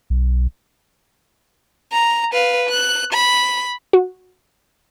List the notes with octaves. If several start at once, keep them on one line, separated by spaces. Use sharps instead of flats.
B1
A#5
B4 F5
F#6
B5
F#4